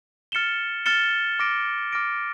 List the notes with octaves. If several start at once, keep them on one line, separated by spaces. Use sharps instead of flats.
F6 A6 C#7 E7 G7
F6 A6 C#7 E7 G7
D6 F6 A#6 D7
D6 F6 A#6 D7